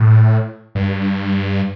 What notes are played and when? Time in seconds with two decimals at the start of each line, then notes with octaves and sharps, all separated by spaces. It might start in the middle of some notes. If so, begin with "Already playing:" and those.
Already playing: A2
0.75 G2